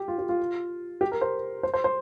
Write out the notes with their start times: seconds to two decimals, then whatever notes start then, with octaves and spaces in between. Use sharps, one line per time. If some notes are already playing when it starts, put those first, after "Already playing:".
Already playing: G4
0.08 F4
0.19 G4
0.29 F4
1.01 G4
1.12 A#4
1.21 C5
1.63 C5
1.74 C5
1.84 C5